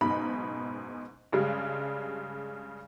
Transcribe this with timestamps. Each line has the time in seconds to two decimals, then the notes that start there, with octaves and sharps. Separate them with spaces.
0.01 F#1 G#2 B2 D#4 B5
1.32 G2 C#3 G3 G#3